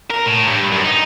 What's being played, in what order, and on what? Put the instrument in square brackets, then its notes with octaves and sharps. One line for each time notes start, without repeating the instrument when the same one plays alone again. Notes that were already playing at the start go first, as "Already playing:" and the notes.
[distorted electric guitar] A#4
A2
G2
F#2
D#4